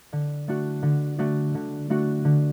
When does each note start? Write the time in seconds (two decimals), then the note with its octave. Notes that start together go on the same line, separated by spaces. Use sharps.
0.13 D3
0.48 A3 D4 F#4
0.83 D3
1.19 A3 D4 F#4
1.55 D3
1.90 A3 D4 F#4
2.25 D3